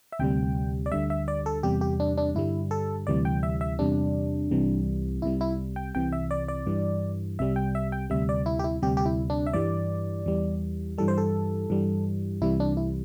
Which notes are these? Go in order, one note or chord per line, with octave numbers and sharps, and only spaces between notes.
E5
D2 C3 G3 G5
D5
D2 D3 G3 E5
E5
D5
A4
E2 C3 G3 G4
G4
D4
D4
G2 D3 G3 E4
A4
D2 C3 E3 G3 D5
G5
E5
E5
E2 C3 G3 D4
C2 C3 E3 G3
C2 C3 G3 E4
E4
G5
C2 C3 E3 G5
E5
D5
D5
G2 E3 G3
C2 C3 G3 E5
G5
E5
G5
D2 C3 G3 E5
D5
E4
G4
E4
D2 C3 G3 G4
G4
E4
D4
E5
G2 E3 G3 D5
E2 E3 G3
G2 E3 G3 A4
C5
A4
G2 E3 G3
C2 C3 E3 G3 E4
D4
E4